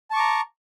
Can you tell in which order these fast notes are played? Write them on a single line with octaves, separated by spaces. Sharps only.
A5 C#6 D6 A#5